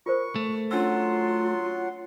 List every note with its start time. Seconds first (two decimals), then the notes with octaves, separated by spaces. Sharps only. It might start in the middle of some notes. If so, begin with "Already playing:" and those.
0.06 F4 A#4 C5 C#6
0.36 A3
0.71 F#3 C#4 D4 F4 F#5 C6 E6